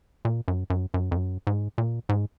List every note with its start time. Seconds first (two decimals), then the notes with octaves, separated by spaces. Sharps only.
0.25 A#2
0.48 F#2
0.70 F#2
0.94 F#2
1.11 F2
1.16 F#2
1.47 G#2
1.78 A#2
2.09 G#2